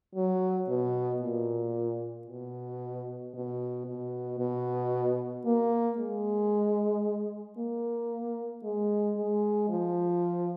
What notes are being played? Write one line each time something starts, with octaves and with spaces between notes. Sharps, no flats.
F#3
B2
A#2
B2
B2
B2
B2
A#3
G#3
A#3
G#3
G#3
F3